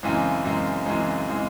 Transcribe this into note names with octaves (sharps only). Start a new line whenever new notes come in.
F#2 C#3 E3 G#3 C4
F#2 C#3 E3 G#3 C4
F#2 C#3 E3 G#3 C4
C#3 E3 G#3 C4